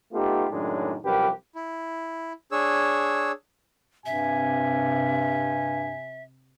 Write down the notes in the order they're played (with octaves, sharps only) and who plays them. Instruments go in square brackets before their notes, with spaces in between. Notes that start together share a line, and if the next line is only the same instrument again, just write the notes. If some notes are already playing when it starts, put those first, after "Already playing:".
[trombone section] A3 B3 D#4 F4 G4
F#2 A2 D#3 G#3 D4
C2 F#2 F3 G4 A#4 B4
[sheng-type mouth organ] E4
D4 G#4 C#5 E6
[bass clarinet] G2 [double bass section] C3 [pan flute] E5 [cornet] G#5